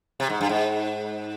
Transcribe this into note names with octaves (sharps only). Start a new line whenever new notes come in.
C3
G#2
G2
G#2